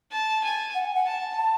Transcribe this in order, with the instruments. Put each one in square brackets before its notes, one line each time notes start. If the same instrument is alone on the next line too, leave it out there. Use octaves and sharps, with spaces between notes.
[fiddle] A5
G#5
[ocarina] F#5
G#5
F#5
[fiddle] A5
[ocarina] A5